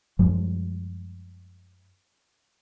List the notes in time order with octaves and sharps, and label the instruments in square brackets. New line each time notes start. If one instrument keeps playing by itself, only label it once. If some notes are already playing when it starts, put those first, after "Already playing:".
[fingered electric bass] F#2 F3 G3 G#3